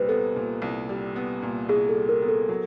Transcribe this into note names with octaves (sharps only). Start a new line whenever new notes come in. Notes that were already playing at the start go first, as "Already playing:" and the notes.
Already playing: C2 A#2 G3 B4 C5
B3 A4
A#2
C2
G3
B3
A#2
C2 G#4
A4
G3
A#4
B3
A4
F#3